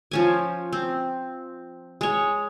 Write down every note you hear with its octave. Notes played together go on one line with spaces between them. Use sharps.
F3 C#4 G#5
C4
G#3 C#5